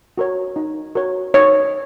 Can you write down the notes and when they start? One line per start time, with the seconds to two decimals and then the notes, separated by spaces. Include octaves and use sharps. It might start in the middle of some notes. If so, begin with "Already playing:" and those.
0.18 F#4 A#4 C#5
0.56 D#4
0.95 F#4 A#4 C#5
1.34 D#4 C#5